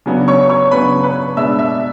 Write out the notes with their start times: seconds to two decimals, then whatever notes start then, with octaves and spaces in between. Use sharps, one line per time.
0.06 C#3 F#3 B3 D4
0.28 C#5 C#6
0.50 C#5 C#6
0.71 C#3 F#3 B3 D4 B4 B5
1.04 B4 B5
1.37 B2 G#3 D4 E5 E6
1.59 E5 E6